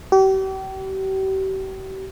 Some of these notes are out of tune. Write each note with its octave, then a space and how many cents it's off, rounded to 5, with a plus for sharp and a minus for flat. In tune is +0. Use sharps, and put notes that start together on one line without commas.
G4 -40